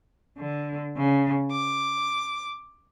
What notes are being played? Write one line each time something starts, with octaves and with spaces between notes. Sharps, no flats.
D3
C#3
D6